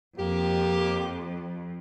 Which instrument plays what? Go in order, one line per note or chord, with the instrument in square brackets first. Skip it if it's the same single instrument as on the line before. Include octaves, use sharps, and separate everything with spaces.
[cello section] F2 [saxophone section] A#3 G4